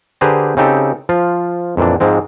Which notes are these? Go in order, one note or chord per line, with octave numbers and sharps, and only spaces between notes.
D3 G4 G#4 B4 C5 A#5
C#3 C4 D#4 G4 A4
F3 F4
F2 A#2 E3 D4
G#2 F3 G#3 C4